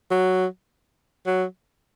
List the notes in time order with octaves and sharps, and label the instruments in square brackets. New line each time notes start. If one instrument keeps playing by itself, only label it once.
[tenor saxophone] F#3
F#3